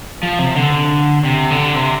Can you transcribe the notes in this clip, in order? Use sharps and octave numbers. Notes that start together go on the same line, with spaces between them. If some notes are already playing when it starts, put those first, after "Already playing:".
F3
C3
D3
C3
D3
C3